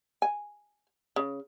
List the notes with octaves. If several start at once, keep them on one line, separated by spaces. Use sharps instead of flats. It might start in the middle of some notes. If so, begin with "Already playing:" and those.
G#5
C#3